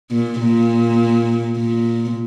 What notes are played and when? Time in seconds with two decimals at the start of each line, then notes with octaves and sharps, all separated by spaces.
0.11 A#2
0.40 A#2
1.57 A#2